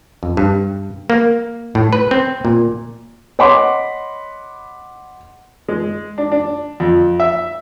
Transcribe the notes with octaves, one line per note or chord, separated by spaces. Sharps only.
F2
G2
A#3
A2
B4
C4
A#2
C#5 D#5 F#5 B5 C6 D6
G#3
D4
D4
F2
E5